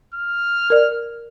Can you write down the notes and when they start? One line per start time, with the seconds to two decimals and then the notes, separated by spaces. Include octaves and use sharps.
0.14 F6
0.70 A#4 D5